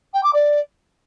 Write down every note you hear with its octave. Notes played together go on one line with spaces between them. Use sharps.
G5
D6
D5